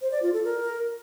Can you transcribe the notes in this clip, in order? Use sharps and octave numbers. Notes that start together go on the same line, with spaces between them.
C5
D5
F4
A4
A#4